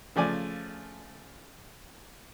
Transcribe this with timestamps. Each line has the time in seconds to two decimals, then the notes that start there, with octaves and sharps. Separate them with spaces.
0.16 C#3 F3 A3 D5 G#5